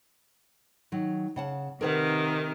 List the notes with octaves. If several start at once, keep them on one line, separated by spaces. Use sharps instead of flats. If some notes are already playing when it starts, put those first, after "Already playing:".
D#3 F#3
C#3 F#5 A5
C3 D#3 A#4 B4 F#5